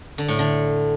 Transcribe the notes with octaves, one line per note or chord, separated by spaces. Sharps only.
D3
A2
D3